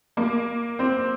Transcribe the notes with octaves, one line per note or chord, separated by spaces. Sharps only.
A#3
C4